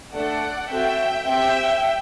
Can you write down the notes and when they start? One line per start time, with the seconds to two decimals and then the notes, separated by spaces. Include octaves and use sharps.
0.13 A3 D4 A4 D5 F#5
0.70 C4 F#4 A4 E5 G5
1.26 C4 G4 E5 G5